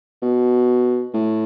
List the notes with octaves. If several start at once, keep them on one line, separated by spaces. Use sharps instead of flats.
B2
A2